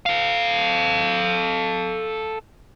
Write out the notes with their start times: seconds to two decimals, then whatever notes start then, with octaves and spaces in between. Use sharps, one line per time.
0.06 A4 F5